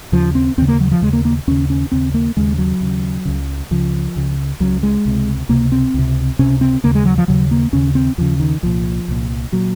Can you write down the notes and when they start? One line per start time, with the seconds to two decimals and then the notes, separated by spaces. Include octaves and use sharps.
0.12 D#2 C#3 F3
0.35 C4
0.57 D#2 C4
0.62 C#3
0.68 A#3
0.80 F#3
0.91 F3
1.02 D#2 C#3 G#3
1.13 A#3
1.25 A#3
1.47 D#2 C#3 C#4
1.70 C#4
1.92 D#2 C#3 C4
2.14 A#3
2.37 D#2 C#3 G#3
2.58 F#3
2.81 D#2 C#3
3.25 C#2 C#3
3.71 C#2 C#3 F3
4.16 C#2 C#3
4.60 C#2 C#3 F#3
4.83 G#3
5.05 C#2 C3
5.49 C#2 C3 A#3
5.72 C4
5.94 C#2 C3
6.39 C#2 C3 C#4
6.61 C4
6.84 D#2 C#3 A#3
6.95 G#3
7.05 F#3
7.18 F3
7.28 D#2 C#3 F#3
7.51 A#3
7.72 D#2 C#3 C#4
7.95 C4
8.18 D#2 C#3 F3
8.40 D#3
8.63 C2 A#2 F3
9.08 C2 A#2
9.52 A#2 F#3